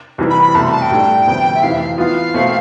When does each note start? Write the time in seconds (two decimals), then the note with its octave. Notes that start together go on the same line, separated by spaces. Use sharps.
0.18 C2 C3 E3
0.30 B5
0.42 B5
0.55 C2 B2 A3 A5
0.64 C6
0.72 A5
0.82 G5
0.90 A2 G3 D4 A4
1.26 D2 C3 F3 B3
1.54 E5
1.63 F2 C3 E3 F5
1.71 E5
1.81 F5
1.98 E3 B3 F4 F5
2.34 B2 A3 C4